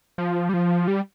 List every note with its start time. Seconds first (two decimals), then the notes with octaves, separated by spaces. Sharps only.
0.18 F3
0.49 G3
0.54 F3
0.88 G3